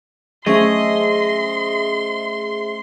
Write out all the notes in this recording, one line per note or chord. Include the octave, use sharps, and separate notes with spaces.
A3 C#4 G#4 C5 D#5 E5 C6